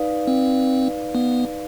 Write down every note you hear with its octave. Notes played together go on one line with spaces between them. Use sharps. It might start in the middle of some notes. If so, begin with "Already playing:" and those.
Already playing: D#4 B4 D5 F5
C4
B3